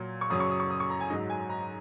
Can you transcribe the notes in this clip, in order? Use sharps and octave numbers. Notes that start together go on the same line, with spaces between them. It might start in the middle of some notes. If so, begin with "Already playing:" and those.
Already playing: A#2 F#3
C#6
F#2 C#3 F#3 D#6
C#6
D#6
C#6
D#6
C#6
A#5
G#5
G#2 F#3 D#5
G#5
A#5